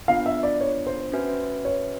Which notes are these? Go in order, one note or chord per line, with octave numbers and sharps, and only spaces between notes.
B3 D4 F4 F5
E5
D5
C#5
C5
C#4 F#4 B4 E5 G#5
C#5